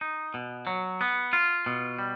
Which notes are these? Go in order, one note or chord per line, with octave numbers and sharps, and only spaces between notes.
D#4
B2
F#3
B3
F4
B2
G3